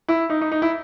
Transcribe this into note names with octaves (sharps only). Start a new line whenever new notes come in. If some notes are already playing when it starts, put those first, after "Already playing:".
E4
D#4
D#4
D#4
E4